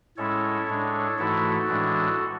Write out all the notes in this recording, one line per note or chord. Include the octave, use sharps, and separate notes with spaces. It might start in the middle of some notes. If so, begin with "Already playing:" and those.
A2 G#3 C#4 E4 A4 C#5
A2 G#3 D4
G#2 E3 A3 E4 F#4 A4
A2 E3 G#3 D4